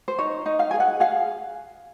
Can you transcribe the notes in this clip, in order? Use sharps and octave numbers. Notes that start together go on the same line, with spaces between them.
C5
D#4 C#5
D#4
F5
G#4 G#5
F#5
G#4 F5